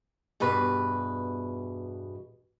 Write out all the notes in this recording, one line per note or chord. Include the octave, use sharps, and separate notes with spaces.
E2 G2 B2 B4